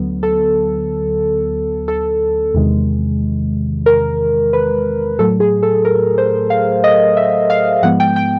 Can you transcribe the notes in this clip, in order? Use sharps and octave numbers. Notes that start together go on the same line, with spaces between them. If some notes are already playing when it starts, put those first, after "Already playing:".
Already playing: D2 D3 F#3 B3
A4
A4
E2 C3 D#3 G#3
A#4
B4
A2 F#3 A3 A4
G#4
A4
A#4
C5
F5
D#5
E5
F5
G#2 F3 G#3 B3 F#5
G5
G5